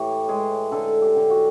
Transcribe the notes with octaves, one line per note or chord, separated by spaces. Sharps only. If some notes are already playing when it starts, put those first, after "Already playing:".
Already playing: A2 E3 G4 C#5
G#3 G#4
D3 A4
G4
D3
F#4